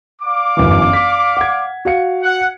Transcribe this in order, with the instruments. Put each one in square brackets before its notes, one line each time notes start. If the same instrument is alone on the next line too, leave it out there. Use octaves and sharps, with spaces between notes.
[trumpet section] D5 F5 D6
[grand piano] G1 F#2 E3
B6
F#5 G#6
F#4 F5 C#7
[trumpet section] F#5